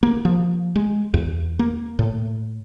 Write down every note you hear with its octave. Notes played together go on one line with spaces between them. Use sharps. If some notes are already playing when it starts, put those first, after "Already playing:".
A#3
F3
G#3
E2
A#3
A2